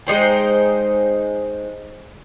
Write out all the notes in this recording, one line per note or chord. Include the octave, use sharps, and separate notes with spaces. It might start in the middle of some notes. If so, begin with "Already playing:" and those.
G#3 D#4 C5 G5